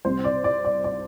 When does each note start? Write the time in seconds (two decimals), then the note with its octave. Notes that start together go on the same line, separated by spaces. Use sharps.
0.05 C2 C3 G3 C4 C5
0.24 D5
0.44 D5
0.65 D5
0.84 D5